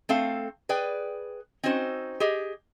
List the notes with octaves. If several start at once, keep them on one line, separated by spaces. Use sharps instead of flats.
A3 C4 A4 F5
G#4 B4 D5 G5
C4 C#4 D#4 F#4 C5
G4 G#4 D#5